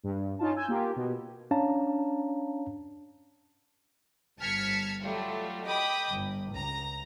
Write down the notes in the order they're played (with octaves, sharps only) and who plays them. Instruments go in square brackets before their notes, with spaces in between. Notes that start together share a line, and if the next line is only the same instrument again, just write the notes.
[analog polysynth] G2
C#4 D#4 F4 A5
G#5 E6 G6
A#3 F4 G4
B2
[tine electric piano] C#4 D4 C#5 F5 A5 A#5
[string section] G1 A5 F6 G#6 B6 C#7
F#3 G3 A3 F4
D#5 G5 B5 D6 D#6
G1
C#2 A#5